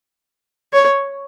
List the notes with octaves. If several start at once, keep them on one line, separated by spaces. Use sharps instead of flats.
C#5